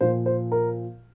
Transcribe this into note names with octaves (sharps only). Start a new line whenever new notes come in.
A#2 F3 C5
C5
A#4